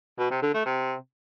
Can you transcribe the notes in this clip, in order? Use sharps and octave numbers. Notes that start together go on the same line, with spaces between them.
B2
C3
D3
A3
C3